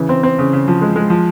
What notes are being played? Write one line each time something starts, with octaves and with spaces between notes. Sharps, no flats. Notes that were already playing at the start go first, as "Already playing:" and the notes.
Already playing: C#3 E3
C4
C4
C#3
C#3
F3
G#3
G#3
F3